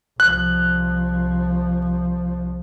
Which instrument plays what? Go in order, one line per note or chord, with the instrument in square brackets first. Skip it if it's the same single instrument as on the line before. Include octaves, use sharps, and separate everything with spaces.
[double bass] C2 F3 [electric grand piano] F#6